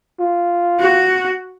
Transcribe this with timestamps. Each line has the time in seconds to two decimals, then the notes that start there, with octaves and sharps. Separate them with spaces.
0.19 F4
0.80 F#4